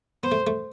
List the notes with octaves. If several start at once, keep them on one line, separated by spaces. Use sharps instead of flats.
B3 C5
A3
A3